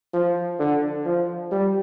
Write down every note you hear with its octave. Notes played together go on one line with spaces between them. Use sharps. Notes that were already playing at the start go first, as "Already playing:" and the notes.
F3
D3
F3
G3